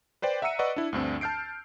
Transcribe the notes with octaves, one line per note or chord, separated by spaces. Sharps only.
B4 C5 D5 G5
E5 F#5 A#5 E6 C#7 D#7
B4 D5 D#5 F#5 C#6
D4 E4
D2 G2 C4 D4
A5 F6 G6 C7 D7